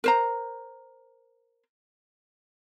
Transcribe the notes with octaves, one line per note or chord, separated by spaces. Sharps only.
A#4 C5 A#5